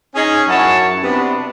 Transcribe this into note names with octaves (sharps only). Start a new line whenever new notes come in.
C#4 D#4 G#4
F#2 F#3 E4 C#5 F#5 A5
C3 B3 D4